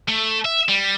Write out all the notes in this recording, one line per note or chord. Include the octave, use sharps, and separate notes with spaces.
A3
E5
G3